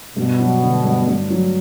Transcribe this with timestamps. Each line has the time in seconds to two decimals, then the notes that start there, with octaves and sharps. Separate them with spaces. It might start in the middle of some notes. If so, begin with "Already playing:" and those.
0.17 G2 B2
0.40 F#3
0.62 D3
0.85 G2
1.08 G2
1.31 F#3